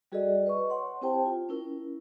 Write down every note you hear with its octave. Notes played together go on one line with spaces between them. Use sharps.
G3 F#4 G#4 A4 D5 D#5
B4 D#5 C#6
C#5 F#5 C6
C4 E4 G4 C5 G5 A5
F4
C#4 E4 A#4